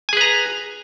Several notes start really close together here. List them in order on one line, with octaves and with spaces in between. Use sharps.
G#5 G#4 B4 A#5